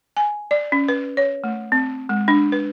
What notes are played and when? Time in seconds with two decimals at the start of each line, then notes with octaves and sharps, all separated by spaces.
0.17 G#5
0.51 D5
0.72 C#4
0.88 B4
1.17 C#5
1.44 A3
1.72 C4
2.09 G#3
2.28 D4
2.52 B4